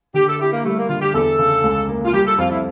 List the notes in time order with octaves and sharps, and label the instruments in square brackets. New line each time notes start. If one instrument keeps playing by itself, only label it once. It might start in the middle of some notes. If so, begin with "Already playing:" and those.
[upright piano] D3 [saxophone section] G4
[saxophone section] A4
[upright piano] E4 [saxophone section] G4
[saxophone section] A#3
[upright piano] G3 [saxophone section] A3
[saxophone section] A#3
[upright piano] D3 [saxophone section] F4
[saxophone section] G4
[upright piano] E2 [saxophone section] A4
[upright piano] C#3
C#2
A#3
[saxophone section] F4
[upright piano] G3 [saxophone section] G4
[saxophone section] A4
[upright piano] F2 [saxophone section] F4
[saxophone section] E4